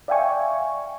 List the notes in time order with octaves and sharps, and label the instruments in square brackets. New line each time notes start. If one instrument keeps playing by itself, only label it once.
[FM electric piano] D5 E5 F5 G5 G#5 C#6